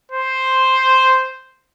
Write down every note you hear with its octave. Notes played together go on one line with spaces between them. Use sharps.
C5